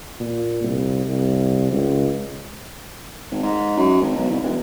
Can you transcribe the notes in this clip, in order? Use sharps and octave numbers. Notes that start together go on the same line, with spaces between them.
A#2
C2
C2
C#2
G#1
G#2
F#2
G#1
B1
C2
E1